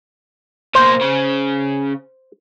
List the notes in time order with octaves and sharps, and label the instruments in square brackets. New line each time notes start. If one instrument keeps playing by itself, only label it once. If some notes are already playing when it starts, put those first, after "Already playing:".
[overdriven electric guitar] B2 A#3 [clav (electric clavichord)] C5
[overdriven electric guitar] C#3